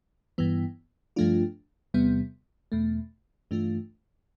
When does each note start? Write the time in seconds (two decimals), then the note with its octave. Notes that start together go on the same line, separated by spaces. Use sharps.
0.38 G2 E3 B3
1.16 G2 F3 A3 D4 F4
1.94 E2 C3 G3 B3
2.72 E2 B2 A3
3.51 G2 E3 A3 D4 F4